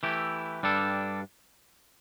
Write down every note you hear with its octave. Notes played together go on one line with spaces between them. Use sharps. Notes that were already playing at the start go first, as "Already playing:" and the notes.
E3 A3 E4 G4
G2 G3 D4 A4